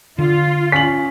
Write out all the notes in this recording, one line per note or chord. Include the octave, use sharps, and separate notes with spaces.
D3 F4
C#4 B6 F#7